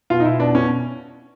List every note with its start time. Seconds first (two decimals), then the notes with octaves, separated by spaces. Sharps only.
0.10 B2 F4
0.20 D#4
0.25 B2 E4
0.40 B2 D4
0.55 B2 C#4